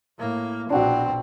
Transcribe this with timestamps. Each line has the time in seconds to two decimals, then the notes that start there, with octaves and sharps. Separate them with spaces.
0.18 A2 A#3
0.70 A#1 B2 C4 D4 F#4